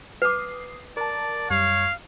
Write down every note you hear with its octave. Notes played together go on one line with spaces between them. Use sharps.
B4 D6 D#6 C7
A#4 D5 A5
F#2 G3 C#5 F5